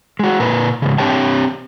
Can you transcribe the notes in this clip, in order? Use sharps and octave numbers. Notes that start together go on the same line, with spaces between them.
G#3 F#4
A#2 A#4 B4
G#2 C#3
C4 D4 G4 C#5 G5 A5